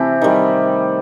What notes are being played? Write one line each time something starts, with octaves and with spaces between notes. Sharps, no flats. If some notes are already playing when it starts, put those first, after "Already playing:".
Already playing: C3 E3 A3 G4
D#3 G3